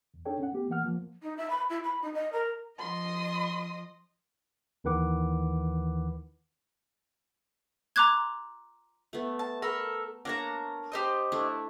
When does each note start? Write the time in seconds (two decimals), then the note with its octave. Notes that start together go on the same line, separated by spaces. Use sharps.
0.14 E2
0.25 D4 D#4 G#4 A4 C#5 G5
0.39 C#4 F#5
0.52 A3 B3 G4
0.69 E3 A#3 F#5 F6
0.83 F3 A#3
1.22 D#4
1.37 E5
1.50 B5
1.70 E4
1.84 B5
2.02 D#4
2.14 D#5
2.32 A#4
2.79 F3 D#5 C6 D#6
4.84 D#2 D#3 E3 B4 F#5 D6
7.96 A#5 C6 D6 F#6 G#6
9.13 A3 B3
9.39 A5
9.62 A4 A#4 B5
10.25 A#3 D4 C#5 A5 A#5
10.92 G4 C5 D#5
11.32 A3 D4 E4